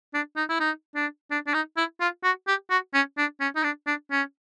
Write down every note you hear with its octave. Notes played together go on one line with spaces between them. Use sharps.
D4
D#4
E4
D#4
D4
D4
D4
D#4
E4
F4
F#4
G4
F#4
C#4
D4
C#4
D#4
D4
D4
C#4